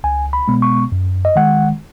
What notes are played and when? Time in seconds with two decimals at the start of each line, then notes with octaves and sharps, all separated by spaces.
0.04 C#2 G#5
0.33 B5
0.48 B2 G#3 B3
0.62 C#6
0.92 F#2
1.25 D#5
1.36 D#3 G#3 F#5